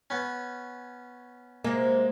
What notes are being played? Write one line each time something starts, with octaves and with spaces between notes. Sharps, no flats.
B3 C#4
C3 G#3 A#3